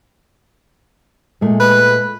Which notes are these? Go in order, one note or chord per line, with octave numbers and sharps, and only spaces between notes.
A#2 G#3 A3
B4